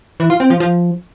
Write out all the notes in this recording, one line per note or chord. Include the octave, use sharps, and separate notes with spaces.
E3
F4
C4
F3
F3